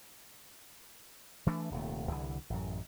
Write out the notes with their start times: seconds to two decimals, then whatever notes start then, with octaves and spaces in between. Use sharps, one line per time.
1.46 E3 A3 D4
1.71 D#1 D#2 C3 A3
2.11 C2 D3 E3
2.50 A1 F#2